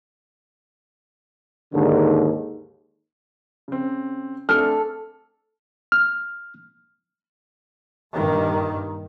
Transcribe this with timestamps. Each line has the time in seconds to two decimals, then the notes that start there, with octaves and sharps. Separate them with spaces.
1.73 D#2 G#2 D3
3.68 C#3 C4
4.49 A3 C4 D4 A4 F6
5.92 F6
8.13 G2 A#2 D#3